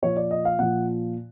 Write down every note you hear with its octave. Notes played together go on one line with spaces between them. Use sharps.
A#2 F3 C#5
D5
D#5
F5
A#2 F3 F#5